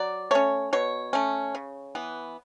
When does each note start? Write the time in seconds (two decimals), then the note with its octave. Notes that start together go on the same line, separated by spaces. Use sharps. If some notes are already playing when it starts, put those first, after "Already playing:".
Already playing: F#3 D5
0.31 A3 C#4 C#5
0.73 B2 C#5
1.13 A3 C#4
1.55 C#3
1.95 E3 B3